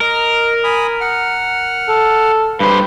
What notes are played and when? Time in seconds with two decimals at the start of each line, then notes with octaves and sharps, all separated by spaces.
0.01 A#4 D#5 F6
0.64 G#5 B5 D#6
1.01 F#5 F6
1.89 A4
2.60 G2 G4 B4 C5